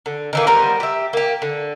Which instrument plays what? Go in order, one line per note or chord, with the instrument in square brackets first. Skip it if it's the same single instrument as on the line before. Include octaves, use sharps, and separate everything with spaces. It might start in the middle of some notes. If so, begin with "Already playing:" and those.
[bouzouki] D3
D#3 E3 A#3
G3 B3 A#4 C5
G4 E5
A#3 G4
D3